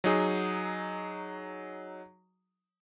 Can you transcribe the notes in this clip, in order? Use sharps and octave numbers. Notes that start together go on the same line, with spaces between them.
F#3 D#4 G#4